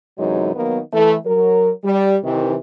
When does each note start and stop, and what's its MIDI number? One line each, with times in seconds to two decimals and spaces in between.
0.18 0.54 42
0.18 0.54 48
0.18 0.54 52
0.18 0.54 54
0.18 0.54 56
0.18 0.54 63
0.55 0.79 51
0.55 0.79 54
0.55 0.79 58
0.55 0.79 59
0.92 1.15 52
0.92 1.15 57
1.25 1.70 54
1.25 1.70 70
1.84 2.16 55
2.24 2.55 48
2.24 2.55 51
2.24 2.55 52